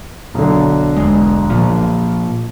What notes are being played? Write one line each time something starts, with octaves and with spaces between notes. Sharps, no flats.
B1 D3
E1 G#3
A#2 F3